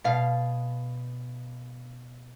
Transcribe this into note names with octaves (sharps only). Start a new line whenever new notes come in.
B2 F5